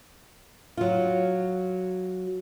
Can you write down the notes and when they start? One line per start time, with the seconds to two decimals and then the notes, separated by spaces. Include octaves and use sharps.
0.77 F#3 F4